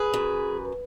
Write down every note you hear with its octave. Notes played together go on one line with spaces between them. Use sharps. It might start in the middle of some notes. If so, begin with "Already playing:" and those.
Already playing: G#4 B4
F#2